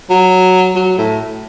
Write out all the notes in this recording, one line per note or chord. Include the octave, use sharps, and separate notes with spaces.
F#3
F#3
A2